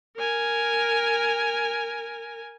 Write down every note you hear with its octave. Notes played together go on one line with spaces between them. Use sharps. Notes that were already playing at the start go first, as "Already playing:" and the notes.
A#4 G#5